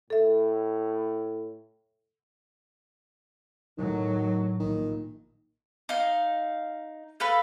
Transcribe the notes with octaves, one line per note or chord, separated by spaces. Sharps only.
A2 A4 E5
A2 D#3 F#3
A#1 D#3
D#4 F5
A4 B4 F5 B5